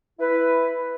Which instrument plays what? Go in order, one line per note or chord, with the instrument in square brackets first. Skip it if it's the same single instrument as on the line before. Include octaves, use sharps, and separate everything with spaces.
[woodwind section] E4 B4